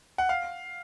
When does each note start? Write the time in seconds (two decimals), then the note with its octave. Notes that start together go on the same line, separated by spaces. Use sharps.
0.18 F#5
0.29 F5